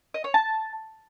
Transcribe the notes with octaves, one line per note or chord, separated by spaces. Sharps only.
D#5
C#5
A5